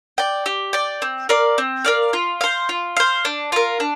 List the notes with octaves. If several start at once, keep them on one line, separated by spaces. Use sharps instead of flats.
D5 G5
G4
D5 G5
C4
A#4 D5 F5
C4
A#4 D5 F5
F4
C5 F5
F4
C5 F5
D4
F4 A#4
D4